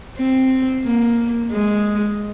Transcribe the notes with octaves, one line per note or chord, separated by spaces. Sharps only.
C4
A#3
G#3